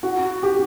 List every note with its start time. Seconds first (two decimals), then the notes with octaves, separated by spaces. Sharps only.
0.03 F#4
0.43 G4